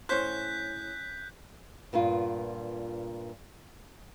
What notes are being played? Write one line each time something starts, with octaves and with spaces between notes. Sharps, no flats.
A2 C#4 C5 C#5 F#6 G6 B6
G2 A#2 B3 F4